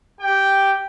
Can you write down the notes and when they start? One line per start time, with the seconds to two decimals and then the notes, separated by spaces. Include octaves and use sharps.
0.20 G4 G5